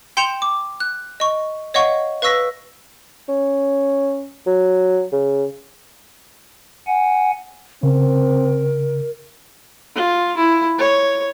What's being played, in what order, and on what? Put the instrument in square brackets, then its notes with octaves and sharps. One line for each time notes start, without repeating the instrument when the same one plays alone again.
[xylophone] G5 C6 G6 C#7 E7 F7
D6
F#6
D#5 C#6
C#5 D#5 F5 F#5 C#6
B4 F5 C#6 E6 A#6 B6
[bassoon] C#4
F#3
C#3
[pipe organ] F#5 G#5
[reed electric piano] C#3 [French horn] C4 [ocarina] A#4
[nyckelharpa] F4
E4
C#5